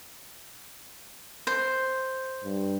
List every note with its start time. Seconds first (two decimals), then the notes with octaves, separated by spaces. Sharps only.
1.47 C5
2.44 G2